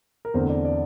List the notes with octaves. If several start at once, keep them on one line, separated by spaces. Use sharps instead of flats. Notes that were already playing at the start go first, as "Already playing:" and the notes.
A#4
E2 D3 A3 C4 C5
D5
D5